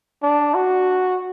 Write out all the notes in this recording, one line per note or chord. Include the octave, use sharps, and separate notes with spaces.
D4
F#4